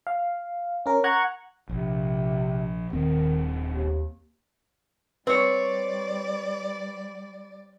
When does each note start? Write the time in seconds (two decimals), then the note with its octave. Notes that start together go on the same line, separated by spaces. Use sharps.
0.07 F5
0.86 C#4 A#4
1.04 F#5 A#5 C#6 F#6 G#6
1.69 A#1 C3
2.93 D#1 D#3 C4
3.68 D#2
5.27 G3 C4 B4 C#5 D5